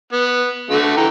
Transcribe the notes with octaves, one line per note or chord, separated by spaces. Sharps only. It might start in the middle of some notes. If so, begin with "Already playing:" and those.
B3
D3 A3 F#4
E3 G5 A#5